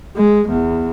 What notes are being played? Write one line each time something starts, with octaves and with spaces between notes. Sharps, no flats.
G#3
E2